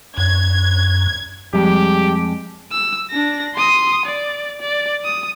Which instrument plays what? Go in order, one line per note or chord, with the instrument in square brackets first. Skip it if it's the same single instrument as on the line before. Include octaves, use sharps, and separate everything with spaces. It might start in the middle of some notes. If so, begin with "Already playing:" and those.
[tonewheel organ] F#2 [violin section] G#6
[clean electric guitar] F2 G#3 [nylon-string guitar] G3 [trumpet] G4
[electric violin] E6
D4 A#6
C6 D#6
D5
D5
D#6